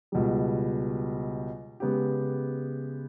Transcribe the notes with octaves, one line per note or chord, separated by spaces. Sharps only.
C#2 B2 G3
C#3 G#3 B3 G4